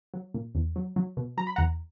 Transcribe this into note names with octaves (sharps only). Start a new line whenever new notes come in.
F#3
A#2
E2
F#3
F#3
B2
F#3 A#5
B5
E2 F#5 A#5